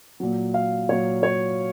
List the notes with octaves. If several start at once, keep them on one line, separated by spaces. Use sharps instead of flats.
A#2 F#3
F5
A#2 F#3 C#5
C#5